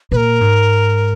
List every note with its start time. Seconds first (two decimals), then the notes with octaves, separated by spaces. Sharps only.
0.12 A#2 B4
0.16 A#4
0.41 G#2